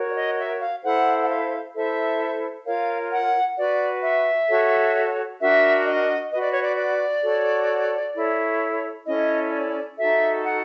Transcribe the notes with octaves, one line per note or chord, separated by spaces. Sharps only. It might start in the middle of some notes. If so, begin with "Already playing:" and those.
Already playing: F#4 A#4 C#5
D5
D#5
E5
F5
E4 A4 C5 F#5
F#5
F5
E4 A4 C5 E5
F4 A#4 C#5 F5
F#5
F#4 B4 D5
E5
F#4 A4 C#5
D4 F#4 A#4 E5
D#5
F#4 B4 D#5
D5
C#5
D5
D5
F#4 A4 C#5
E4 A4 C#5
C#4 E4 A4 C#5 D#5
D5
D#4 F#4 A4 E5
F#5